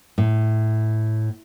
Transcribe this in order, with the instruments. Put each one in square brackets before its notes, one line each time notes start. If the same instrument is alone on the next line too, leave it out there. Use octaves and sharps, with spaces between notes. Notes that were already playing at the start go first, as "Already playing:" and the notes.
[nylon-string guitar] A2